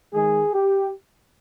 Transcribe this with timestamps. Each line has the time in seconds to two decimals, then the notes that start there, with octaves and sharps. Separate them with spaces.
0.13 D#3 G#3 G#4
0.53 G4